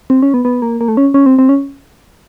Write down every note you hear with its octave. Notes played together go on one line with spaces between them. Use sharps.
C4
C#4
B3
B3
A#3
A#3
A3
C#4
C#4
C4
C4
C#4